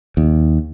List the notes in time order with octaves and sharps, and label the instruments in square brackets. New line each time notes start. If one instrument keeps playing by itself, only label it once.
[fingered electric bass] D#2